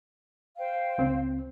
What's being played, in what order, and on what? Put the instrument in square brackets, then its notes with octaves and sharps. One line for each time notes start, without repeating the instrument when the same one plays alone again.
[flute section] C5 F5 G5
[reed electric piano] C#2 C4